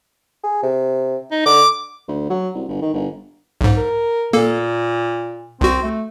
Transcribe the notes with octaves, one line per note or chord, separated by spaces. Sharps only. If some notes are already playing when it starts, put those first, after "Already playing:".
G#4
C3
D#4
D3 D6
D2
F#3
C2
G1
D#3
G1
B1 G#2
A#4
A#2 A#3 A4
C2 C4 F#4
A3